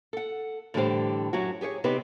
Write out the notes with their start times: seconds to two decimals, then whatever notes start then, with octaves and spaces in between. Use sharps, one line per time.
0.13 A4 F#5
0.74 A2 D3 E3 G3 G4 C5
1.33 F#2 F#3 E4 F#4
1.61 G4 G#4 C5 C#5
1.84 C3 B3 C4 D#4 G4 B4